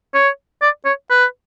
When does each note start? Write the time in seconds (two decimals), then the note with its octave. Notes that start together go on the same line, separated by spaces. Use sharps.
0.14 C#5
0.62 D5
0.85 C#5
1.10 B4